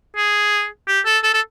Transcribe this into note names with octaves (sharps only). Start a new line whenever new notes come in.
G#4
G4
A4
A4
A4